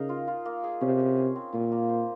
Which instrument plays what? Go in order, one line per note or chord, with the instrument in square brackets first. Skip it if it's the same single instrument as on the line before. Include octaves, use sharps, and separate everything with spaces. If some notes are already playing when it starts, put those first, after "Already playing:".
Already playing: [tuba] C#3 [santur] D#4 A#4 F5
[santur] F4
F4
A#3
G#4
[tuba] C3 [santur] C#4
[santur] C#4
G#4
C4
[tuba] A#2 [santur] F4
[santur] A#3
C5